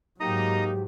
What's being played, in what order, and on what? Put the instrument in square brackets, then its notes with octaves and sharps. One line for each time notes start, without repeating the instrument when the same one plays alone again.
[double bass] G#2 F#3 [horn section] A#3 D#4 [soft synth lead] G4 [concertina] D#5 A#5 D#6